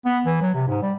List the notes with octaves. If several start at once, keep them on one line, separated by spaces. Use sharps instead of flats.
B3
E3
F#3
C3
G#2
G3